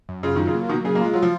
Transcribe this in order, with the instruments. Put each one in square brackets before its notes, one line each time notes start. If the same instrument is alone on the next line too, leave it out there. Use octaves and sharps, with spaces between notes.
[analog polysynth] F#2
[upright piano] C#3 [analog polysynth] F4
[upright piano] D#3 [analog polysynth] F#3
[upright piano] C#3
[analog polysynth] A#3
[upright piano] B2 D#3 [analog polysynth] F#3
[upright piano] C#3 [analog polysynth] G#4
[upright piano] A#3
[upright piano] G#3 [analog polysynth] F4
[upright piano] F#3 [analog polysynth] F4
[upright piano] F3